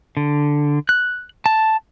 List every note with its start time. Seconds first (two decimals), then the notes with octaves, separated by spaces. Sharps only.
0.17 D3
0.89 F#6
1.46 A5